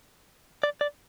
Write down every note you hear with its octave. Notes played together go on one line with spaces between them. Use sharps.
D5
D5